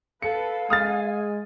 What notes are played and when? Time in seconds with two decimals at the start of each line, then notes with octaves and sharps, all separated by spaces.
0.22 A4 B4 F5 C#7
0.70 G#3 G#5 D#6 F6 A6